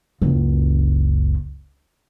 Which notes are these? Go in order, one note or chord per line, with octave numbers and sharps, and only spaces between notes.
F#1 C#2